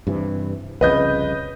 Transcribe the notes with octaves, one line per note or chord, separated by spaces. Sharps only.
G2 C3 E3
C2 F2 C#3 B4 D#5 G6